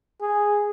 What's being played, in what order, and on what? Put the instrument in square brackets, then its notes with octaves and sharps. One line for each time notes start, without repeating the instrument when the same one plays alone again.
[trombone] G#4